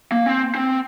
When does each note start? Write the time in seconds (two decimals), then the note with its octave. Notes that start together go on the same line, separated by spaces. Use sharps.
0.12 A#3
0.26 C4
0.55 C4